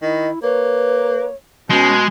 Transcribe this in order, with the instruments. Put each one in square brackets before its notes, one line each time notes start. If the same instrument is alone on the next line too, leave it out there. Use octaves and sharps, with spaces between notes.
[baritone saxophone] D#3 [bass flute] E4 [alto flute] D#5
[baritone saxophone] A#3 [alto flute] B4 [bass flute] C#5
[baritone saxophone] B2 [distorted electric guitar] G#3 [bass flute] C#4 [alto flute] F#4